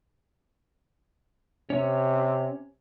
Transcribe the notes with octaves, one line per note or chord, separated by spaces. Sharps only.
C3 C#4 C#5